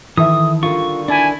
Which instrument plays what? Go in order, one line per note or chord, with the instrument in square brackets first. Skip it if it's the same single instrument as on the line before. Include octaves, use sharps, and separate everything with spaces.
[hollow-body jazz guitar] D#3 E3 [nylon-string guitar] A4 E5 [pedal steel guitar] D#6
[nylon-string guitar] D3 D#3 G3 [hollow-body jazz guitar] F4 [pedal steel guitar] C#6
[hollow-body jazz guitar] D4 [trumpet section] E4 G#5